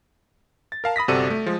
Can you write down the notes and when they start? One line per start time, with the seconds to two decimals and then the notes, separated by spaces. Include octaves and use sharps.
0.72 A6
0.84 A#4 F5 A5
0.96 B5 D#6 A#6 B6
1.08 G1 C3 F#4 A4 D5 D#7
1.30 A3
1.46 F3 G#3